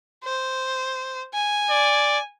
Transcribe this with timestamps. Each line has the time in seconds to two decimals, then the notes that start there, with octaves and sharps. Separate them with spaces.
0.25 C5
1.34 G#5
1.70 D5